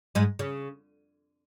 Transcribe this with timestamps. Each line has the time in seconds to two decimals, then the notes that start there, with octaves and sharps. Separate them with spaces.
0.15 G#2 G#3
0.39 C#3